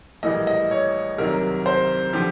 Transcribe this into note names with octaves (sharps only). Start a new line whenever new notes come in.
A#1 A2 E3 G3 A#3 D#5
D#5
C#5
C2 C3 D#3 F#3 A#4
C5
D3 F3 G4